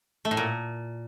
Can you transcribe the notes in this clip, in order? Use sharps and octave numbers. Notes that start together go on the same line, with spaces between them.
A3
A2
A#2